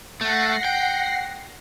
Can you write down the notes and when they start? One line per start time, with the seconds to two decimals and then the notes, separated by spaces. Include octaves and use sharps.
0.21 A3 F#5 A#6 C7
0.65 G5